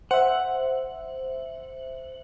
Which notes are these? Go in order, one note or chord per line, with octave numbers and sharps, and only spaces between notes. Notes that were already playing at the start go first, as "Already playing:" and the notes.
C5 E5 F#5